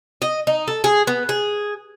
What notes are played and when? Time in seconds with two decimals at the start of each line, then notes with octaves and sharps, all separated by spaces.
0.22 D#5
0.47 D#4
0.68 A4
0.84 G#4
1.07 B3
1.29 G#4